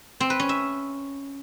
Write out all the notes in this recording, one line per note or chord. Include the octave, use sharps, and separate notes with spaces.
C4
B4
C#4
E5